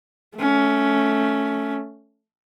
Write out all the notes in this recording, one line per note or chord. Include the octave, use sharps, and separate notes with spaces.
A3 C#4